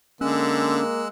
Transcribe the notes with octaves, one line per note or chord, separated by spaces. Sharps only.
D3 G#3 A#3 C#4 E6 F#6